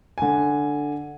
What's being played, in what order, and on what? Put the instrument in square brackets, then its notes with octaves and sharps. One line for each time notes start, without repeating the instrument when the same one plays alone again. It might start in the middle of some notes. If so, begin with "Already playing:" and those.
[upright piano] D3 G#5